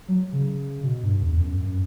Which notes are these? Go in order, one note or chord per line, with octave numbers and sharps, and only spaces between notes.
F#3
C#3
B2
G2
E2
E2
F#2
F#2